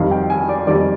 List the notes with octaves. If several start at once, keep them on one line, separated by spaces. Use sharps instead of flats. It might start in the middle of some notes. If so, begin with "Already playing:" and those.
Already playing: F2 D#3 G3 F5
G5
G#5
D5
F2 D#3 G3 D5